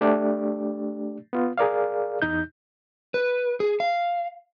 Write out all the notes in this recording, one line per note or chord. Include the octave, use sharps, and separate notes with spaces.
A3 D4 G4 D5
B3 F4
G#4 A#4 D5 F5
E2 D#4 G6
B4
G#4
F5